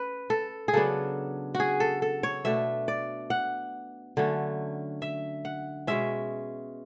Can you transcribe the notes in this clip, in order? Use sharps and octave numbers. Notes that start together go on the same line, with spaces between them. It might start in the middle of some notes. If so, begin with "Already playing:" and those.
Already playing: C#4 B4
A4
G#4
C#3 F#3 B3 D4 A4
F#4
G#4
A4
A4
C#5
B2 A3 D4 E5
D5
F#5
D3 F#3 A3 C#4
E5
F#5
B2 G#3 C#4 E5